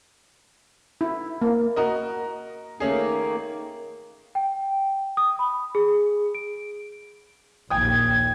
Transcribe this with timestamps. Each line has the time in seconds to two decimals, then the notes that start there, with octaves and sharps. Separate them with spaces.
1.01 E4
1.42 A#3
1.76 F#4 A#4 D#5
2.80 D#3 A3 A#3 C#4 G#4
4.35 G5
5.17 D#6
5.39 B5
5.75 G#4
6.35 D7
7.70 A#1 D#2 A#2 G5 D#6 G#6